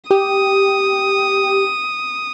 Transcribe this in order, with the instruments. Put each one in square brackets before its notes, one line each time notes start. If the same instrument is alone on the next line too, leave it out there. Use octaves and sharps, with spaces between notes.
[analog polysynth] G4 [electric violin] D#6